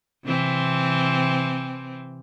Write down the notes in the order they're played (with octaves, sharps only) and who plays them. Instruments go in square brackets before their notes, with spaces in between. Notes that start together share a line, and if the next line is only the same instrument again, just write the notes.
[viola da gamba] C3 E3 C4